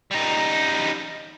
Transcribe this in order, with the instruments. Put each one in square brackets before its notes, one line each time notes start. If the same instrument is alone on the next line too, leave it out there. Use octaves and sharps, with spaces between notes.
[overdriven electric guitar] G3 D#4